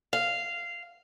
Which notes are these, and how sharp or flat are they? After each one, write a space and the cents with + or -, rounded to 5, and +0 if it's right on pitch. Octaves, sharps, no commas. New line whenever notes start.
F5 -10